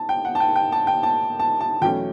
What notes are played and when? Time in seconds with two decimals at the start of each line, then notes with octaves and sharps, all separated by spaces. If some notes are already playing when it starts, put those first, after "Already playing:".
Already playing: A5
0.09 G5
0.25 F#5
0.35 A5
0.40 G5
0.56 G5
0.72 A5
0.87 G5
1.03 A5
1.40 A5
1.60 A5
1.81 E2 B2 F#3 A3 C#4 G5